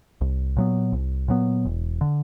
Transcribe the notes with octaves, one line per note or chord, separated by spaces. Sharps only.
C2
A#2 F#3 B3
C2
A#2 F#3 B3
E1
D3